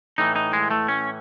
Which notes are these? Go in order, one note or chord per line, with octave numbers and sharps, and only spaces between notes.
A2 E3 D#4
D#4
G#3
A3
C#4